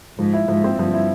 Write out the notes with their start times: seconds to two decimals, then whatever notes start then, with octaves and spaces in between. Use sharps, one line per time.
0.18 G#2 F3
0.33 E4
0.48 G#2 F3
0.64 C4
0.79 G2 F3
0.94 E4